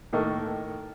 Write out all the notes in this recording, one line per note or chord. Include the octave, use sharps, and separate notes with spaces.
A2 D#3 A#3 A4 D#5 C#6